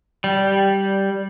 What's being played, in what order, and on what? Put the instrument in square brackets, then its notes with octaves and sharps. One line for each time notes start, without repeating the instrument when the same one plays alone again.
[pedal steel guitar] G3